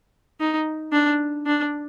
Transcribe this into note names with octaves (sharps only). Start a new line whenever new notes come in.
D#4
D4
D4